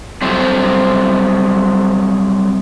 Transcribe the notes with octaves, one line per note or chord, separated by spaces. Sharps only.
F#3 G3 C4 G4 A4 C5